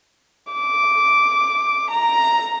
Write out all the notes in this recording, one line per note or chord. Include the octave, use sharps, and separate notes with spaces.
D6
A#5